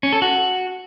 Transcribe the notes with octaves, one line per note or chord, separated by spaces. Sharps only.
C#4
A4
F#4